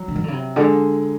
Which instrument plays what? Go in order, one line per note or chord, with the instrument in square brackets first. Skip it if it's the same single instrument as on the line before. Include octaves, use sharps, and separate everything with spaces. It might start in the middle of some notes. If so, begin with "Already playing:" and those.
Already playing: [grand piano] F#3
[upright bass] D3
D#3
D3
C#3
C3
[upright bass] D3 [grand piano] G#3